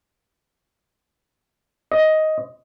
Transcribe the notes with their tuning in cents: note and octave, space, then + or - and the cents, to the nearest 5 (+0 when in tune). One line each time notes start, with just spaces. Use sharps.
D#5 +10